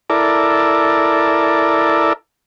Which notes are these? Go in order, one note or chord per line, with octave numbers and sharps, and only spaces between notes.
E4 A4 A#4 D5